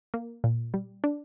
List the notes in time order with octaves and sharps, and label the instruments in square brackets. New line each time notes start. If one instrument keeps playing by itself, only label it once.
[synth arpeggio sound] A#3
A#2
G3
D4